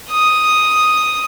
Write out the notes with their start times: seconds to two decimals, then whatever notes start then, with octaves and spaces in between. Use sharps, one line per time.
0.10 D#6